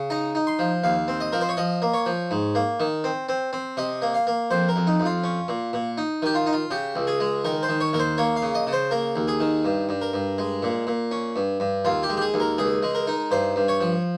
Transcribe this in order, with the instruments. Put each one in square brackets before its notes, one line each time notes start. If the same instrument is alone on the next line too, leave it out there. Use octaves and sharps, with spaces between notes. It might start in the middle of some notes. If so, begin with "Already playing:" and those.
Already playing: [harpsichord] C#3
D#4 A#5
D#4
C6
F3
D#2 F5
C4
D#5
F3 A#4
C5
C#5
F3 D#5
A#3
C#5
F3
G#2
A#3
D#3
C4
C4
C4
C3 D#5
A#3
F5
A#3
F2 C5
A#4
F2
D#4
F2
F4
C#4
A#2
A#2
D#4
D#3 G4
F4
D#4
F4
C#3 G4
C#2
G#4
G#3
D#3 A#4
C5
D#3
C#5
D#2 A#4
C5
A#3 C#5
F5
C#3
D#5
C#3
C5
A#3 A#4
D#2
G#4
D#3
G2
G2
A#4
G2
G#3
A#2
A#2
C#4
G2
G2
D#2 F4
G4
G#3
G4
G#4
D#2
A#4
C#2 G#4
G#3
A#4
D#4
G2 C5
G2
C#5
F3